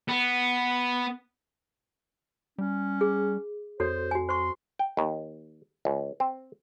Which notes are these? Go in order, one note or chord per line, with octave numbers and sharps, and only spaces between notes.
B3
G3 C#4
G#4
F2 F#4 A4 C5 C#5
F#4 G#5
C5 C6 C#6
G5
D#2
C#2
C4